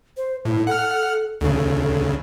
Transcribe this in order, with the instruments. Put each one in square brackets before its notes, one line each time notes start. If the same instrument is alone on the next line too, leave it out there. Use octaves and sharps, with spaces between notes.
[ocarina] C5
[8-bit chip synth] A2 [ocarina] E4
[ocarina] A4 [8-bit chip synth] F#5 F6
[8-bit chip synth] D2 C#3 [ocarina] A4